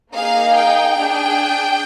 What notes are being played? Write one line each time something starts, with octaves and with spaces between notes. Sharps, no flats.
A#3 D#4 G#4 F5
G5
D4 G#4